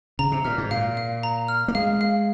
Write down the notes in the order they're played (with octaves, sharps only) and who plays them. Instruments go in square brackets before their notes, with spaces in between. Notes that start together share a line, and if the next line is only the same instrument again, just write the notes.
[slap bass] C#3 [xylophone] A#5
[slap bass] C3
[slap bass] A#2 [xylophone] F6
[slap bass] G#2
[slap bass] A#2 [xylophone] F5
[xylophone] F5
A#5
F6
[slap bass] A#3
[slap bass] G#3 [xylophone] F5
[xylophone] F5